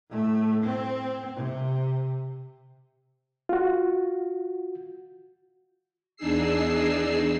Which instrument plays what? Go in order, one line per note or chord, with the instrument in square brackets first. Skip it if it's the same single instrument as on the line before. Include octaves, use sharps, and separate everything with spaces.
[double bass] A2 A3
C4
C3
[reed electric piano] F4 F#4
[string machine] E2 D4 D#4 G#4 E6 C7